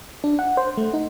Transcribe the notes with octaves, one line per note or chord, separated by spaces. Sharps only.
D4
F#5
C5
A3
D#4